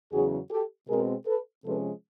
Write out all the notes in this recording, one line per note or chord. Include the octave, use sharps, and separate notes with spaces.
E2 C#3 F#3 F#4 G#4
G4 A4
B2 G#3 C4 G#4 A#4
A4 B4
C3 F3 G#3 C#4 A4 B4